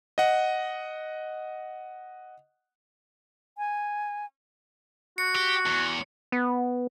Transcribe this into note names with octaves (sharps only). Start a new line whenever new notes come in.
D#5 F#5
G#5
F#4 C#7
G4
E2
B3